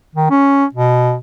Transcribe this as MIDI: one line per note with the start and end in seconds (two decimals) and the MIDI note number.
0.15 0.30 51
0.31 0.65 61
0.75 1.16 47